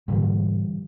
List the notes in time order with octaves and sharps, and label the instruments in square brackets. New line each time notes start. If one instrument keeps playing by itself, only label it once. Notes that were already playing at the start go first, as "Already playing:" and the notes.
[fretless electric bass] G#2 B2 A#3 [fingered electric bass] D3 E3 G3